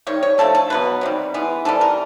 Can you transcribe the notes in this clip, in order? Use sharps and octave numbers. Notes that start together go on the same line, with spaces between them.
D#3 G3 C#5
C#5
D3 F3 A3 A4
A4
B2 F#3 B3 B4
C3 D#3 G3
E3 G#3 B3
C3 E3 G3 A4
A#4